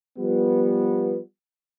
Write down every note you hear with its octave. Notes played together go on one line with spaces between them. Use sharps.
F3 G3 B3